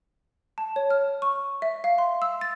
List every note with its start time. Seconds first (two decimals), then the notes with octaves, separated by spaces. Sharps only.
0.58 A5
0.76 C#5
0.90 F6
1.22 C#6
1.62 E5
1.84 F5
1.98 C6
2.22 E6
2.41 A6